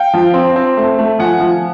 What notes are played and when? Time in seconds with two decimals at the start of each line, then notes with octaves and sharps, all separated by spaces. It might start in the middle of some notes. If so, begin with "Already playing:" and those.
Already playing: F5 G5
0.13 F3
0.34 C4
0.56 C4
0.77 A3
0.98 A3
1.19 F3 F#5 G#5
1.40 F3